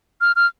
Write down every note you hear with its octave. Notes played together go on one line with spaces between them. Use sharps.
F6
F6